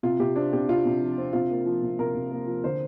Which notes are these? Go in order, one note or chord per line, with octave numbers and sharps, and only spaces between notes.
C3 F4
C3 G4
C4 D4
C3 G4
C3 F4
C3
F3
C4
C3 F4
A#3
F3
C3
C3 A#4
C3
A#3
F3
D3 C5